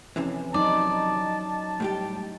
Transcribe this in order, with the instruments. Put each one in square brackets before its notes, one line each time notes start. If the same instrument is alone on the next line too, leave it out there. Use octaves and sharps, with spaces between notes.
[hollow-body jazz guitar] F2 C3 E3 [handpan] C#4
[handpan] F#3 D#4 [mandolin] D5 [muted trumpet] A5
[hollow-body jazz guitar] A2 G3 G4